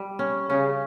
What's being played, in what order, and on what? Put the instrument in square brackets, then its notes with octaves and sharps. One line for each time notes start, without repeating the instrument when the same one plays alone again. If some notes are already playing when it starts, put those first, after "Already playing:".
Already playing: [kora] G3
C#4
[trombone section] C#3 [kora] C#4